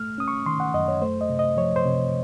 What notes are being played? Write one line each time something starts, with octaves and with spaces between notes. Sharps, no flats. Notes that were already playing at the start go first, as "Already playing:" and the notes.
Already playing: A3 F6
C#4 D#6
C#6
D#3 C6
F#5
F#2 D#5
C#5
A3 C5
D#5
C3
D#5
F3 C#5
C5
C3